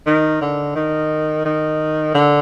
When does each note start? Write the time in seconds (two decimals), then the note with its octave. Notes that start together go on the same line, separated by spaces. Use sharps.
0.06 D#3
0.41 D3
0.75 D#3
1.45 D#3
2.14 D3